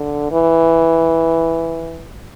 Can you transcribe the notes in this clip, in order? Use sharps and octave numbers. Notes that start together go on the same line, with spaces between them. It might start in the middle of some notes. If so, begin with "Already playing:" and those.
Already playing: D3
E3